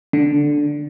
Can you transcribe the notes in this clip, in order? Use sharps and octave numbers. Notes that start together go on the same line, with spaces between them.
D3